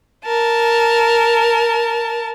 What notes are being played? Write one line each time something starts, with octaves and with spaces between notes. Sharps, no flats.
A#4 A5